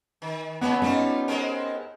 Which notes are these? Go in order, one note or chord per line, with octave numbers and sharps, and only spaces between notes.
D#3
C#3 F#3 B3 C#4
G3 C#4 D#4 F4
G#3 C4 A#4